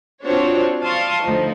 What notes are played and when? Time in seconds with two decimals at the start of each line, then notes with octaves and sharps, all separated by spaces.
0.24 C4 D4 F4 F#4 C5 C#5
0.83 D5 F5 A5 C6 C#6 D#6
1.21 D2 F3 D#4